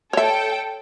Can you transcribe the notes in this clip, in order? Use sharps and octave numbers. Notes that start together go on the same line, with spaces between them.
A4 C#5 E5 G5